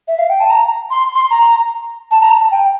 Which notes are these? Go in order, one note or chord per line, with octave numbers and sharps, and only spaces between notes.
E5
F5
G5
A5
A#5
C6
C6
A#5
A5
A#5
A5
G5